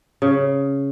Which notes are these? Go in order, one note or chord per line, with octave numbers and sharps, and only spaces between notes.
C#3